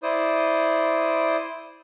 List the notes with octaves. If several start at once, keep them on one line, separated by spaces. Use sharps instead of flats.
E4 C5 D5 D#6